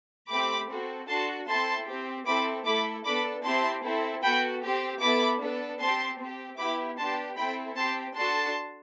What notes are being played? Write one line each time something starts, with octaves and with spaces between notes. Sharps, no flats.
A3 C4 G4 B5 D6
C4 F#4 A4
D4 F#4 A4 A5 C6
C4 E4 A4 A5 C6
C4 G4
C4 E4 A4 B5 D6
A3 E4 A4 B5 D6
B3 D4 A4 B5 D6
C4 E4 G4 A5 C6
C4 E4 A4
B3 F#4 A4 G5 B5
C4 G4
B3 E4 A4 B5 D6
B3 D4 A4
C4 G4 A5 C6
C4 G4
B3 E4 G4 B5 D6
B3 D4 G4 A5 C6
C4 E4 A4 G5 B5
C4 G4 A5 C6
D4 F#4 A4 A5 C6